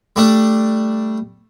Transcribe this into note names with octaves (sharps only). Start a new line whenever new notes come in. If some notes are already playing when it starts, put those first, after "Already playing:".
G3 A3 D4